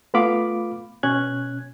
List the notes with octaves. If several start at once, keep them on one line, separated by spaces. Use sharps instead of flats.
A3 B3 F4 F5 B5 D6
B2 C#4 F#6 G#6